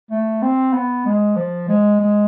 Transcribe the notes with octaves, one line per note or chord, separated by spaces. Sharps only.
A3
C4
B3
G#3
F3
G#3
G#3